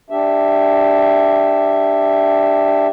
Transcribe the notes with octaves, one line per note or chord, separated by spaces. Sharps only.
D4 G4 E5